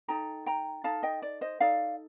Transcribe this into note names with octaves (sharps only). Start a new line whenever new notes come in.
D#4 A4 G5 A#5
G5 A#5
D#4 A4 F5 A5
D#5 G5
D5
C5 D#5
D#4 A4 D5 F5